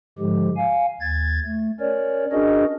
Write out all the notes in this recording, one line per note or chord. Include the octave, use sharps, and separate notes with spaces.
G#2 D3 F3 G#3 G4
F5 G#5
D#2 G#6 A6
A3
C#4 A#4 C#5 D5
C#4 D4 F#4 G#4 A#4 D#5